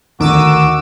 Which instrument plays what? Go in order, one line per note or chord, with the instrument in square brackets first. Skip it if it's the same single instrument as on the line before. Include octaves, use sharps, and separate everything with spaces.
[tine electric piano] D2 D3 [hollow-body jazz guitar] D#3 [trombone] F#4 [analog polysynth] D6 E6 D#7